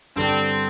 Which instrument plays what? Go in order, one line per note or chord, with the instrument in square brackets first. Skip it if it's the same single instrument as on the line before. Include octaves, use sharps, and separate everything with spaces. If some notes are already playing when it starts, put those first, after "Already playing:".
[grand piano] G2 D3 G3 [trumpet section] C4